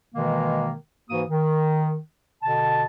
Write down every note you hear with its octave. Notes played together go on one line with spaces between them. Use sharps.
B2 D#3 E3 G#3 A#3
G#2 E3 A#3 F#4 D#6
D#3
B2 D3 A5